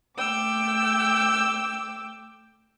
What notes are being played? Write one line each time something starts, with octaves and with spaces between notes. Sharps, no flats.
A3 G5 D6 E6